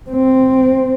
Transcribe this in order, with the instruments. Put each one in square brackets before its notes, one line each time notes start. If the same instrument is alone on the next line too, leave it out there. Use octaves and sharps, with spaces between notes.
[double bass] C4